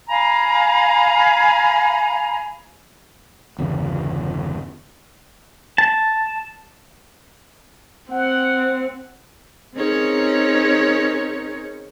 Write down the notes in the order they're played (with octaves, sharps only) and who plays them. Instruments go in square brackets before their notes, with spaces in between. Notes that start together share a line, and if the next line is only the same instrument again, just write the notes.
[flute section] F5 G#5 A#5 B5
[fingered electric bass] G1 E2 C#3
[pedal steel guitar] A5
[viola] C4 [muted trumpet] F#5
[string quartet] C4 C#4 D#4 G#4 A#4 C#5